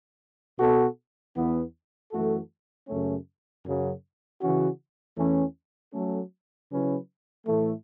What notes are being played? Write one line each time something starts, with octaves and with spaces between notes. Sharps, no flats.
B2 B3 F#4 A4
E2 E3 B3
F#2 E3 A3 F#4 A4
F#2 C#3 A3 C#4
F#2 C#3 F#3
C#3 E3 C#4 F#4
E2 E3 A3 C#4
F#3 A3 C#4 A4
C#3 F#3 C#4 E4 B4
A2 E3 A3